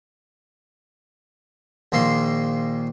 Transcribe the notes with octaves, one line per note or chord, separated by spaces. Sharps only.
A#1 D#3 A#3 C6